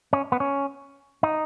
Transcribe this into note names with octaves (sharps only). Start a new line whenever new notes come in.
C#4
B3
C#4
D#4